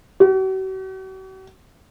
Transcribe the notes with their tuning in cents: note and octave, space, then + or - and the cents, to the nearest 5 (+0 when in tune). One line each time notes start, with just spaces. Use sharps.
F#4 +45